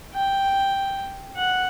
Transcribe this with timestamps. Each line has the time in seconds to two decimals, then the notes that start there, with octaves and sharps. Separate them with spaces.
0.14 G5
1.36 F#5